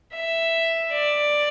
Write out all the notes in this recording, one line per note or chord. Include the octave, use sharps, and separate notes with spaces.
E5
D5